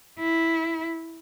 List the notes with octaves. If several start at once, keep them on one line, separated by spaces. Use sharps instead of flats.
E4